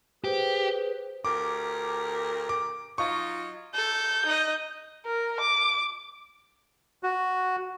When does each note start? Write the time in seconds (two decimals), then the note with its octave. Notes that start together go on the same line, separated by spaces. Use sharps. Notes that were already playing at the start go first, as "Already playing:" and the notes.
0.24 G4 G#4 B4 C5
1.25 D2 G4 A#4 D6
2.49 D6
2.98 F#3 D#4 F4 C#6
3.74 A4 G6
4.25 D#4 D#5
5.06 A#4
5.40 D6
7.03 F#4